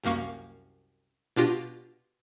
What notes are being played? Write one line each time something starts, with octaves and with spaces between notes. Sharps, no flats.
C2 F#2 A#3 F5 C#6
B2 D4 F4 G4 A#6